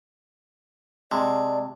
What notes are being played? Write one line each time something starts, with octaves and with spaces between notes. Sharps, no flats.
C3 G#3 D5 A5